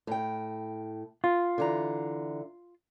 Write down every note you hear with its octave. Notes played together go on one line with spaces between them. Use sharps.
A2 G5
F4
D3 E3 A#5